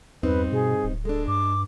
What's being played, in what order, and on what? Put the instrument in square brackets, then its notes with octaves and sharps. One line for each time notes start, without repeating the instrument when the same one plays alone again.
[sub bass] E2 [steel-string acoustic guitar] G2 C4 D#4 [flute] B4
[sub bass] B2 [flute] G#4
[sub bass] D1
[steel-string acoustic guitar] G#3 D4 [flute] A4
[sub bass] G2 [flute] D6